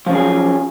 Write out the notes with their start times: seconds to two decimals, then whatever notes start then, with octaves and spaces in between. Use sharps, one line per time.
0.06 F3
0.09 C#4
0.12 F#3
0.15 G#4
0.18 F4